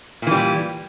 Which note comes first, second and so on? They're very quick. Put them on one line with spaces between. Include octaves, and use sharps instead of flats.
A#2 E3 G3